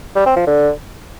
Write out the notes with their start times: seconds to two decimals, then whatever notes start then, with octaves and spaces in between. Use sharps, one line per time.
0.15 G3
0.26 C4
0.36 F3
0.47 D3